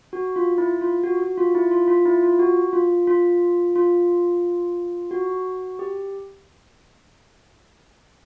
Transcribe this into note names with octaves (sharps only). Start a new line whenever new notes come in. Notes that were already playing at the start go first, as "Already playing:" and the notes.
F#4
F4
E4
F4
F#4
F#4
F4
E4
F4
F4
E4
F4
F#4
F4
F4
F4
F#4
G4